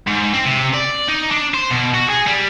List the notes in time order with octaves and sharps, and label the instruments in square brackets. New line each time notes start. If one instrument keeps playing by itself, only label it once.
[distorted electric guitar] G#2
C4
C3
D5
D#4
D4
C5
B2
F#4
G#4
G3